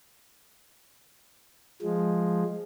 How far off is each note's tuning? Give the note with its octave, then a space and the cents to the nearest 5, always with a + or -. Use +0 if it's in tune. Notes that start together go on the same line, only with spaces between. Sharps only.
F3 +0 G#3 +0